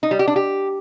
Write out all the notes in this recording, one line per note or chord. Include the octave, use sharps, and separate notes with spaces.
D#4
G3
G4
D4
G4